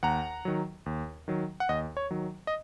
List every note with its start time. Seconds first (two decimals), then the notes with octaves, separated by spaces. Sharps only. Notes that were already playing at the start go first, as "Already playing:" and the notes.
0.03 D#2 F#5 A#5
0.45 D#3 F#3
0.86 D#2
1.28 D#3 F#3
1.60 F#5
1.69 D#2 D#5
1.97 C#5
2.11 D#3 F#3
2.47 D#5